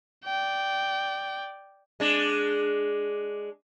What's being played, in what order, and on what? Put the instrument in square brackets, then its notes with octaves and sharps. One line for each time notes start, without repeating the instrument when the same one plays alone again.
[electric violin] D5 G5
[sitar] G#3 D4